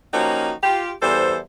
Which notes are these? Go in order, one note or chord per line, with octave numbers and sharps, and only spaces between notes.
F3 A#3 C#4 D#4 F#4 G4
F4 G4
E2 E3 G3 A4 C5